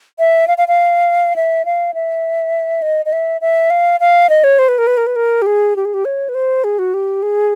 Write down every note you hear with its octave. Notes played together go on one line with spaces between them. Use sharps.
E5
F5
F5
F5
E5
F5
E5
D#5
D#5
E5
E5
F5
F5
D#5
C#5
C5
B4
A#4
B4
A#4
B4
A#4
G4
G#4
G4
G#4
G4
C#5
B4
C5
G#4
F#4
G4
G#4